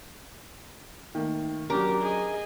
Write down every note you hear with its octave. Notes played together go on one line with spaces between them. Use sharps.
D#3 A3 A#3
F#3 C#4 D4 G4 A#4
G#4 D#5